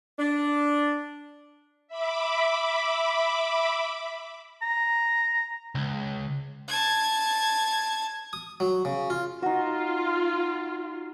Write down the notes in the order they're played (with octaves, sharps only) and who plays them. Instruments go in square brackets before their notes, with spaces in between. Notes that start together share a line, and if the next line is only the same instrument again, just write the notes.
[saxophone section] D4
[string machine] E5 B5 D6
[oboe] A#5
[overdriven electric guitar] C#2
[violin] A5 G#6
[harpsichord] D#6
F#3
C#3
F4
[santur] D#4 F#4 [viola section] F4